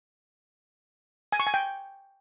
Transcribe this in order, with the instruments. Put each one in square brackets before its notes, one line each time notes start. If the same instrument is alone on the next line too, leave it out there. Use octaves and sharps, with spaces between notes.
[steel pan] G#5
C#6
G#5
G5